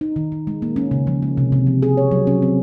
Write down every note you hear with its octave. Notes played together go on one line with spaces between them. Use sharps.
D#4
D#3
D#3
G#3
A#3
C#4
C#3
F3
G#3
C3
C3
F3
G#4
C#5
F#3
C#4
C4